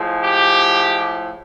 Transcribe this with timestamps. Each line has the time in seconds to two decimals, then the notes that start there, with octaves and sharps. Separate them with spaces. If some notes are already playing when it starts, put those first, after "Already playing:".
Already playing: A2 F3 G#3
0.23 G4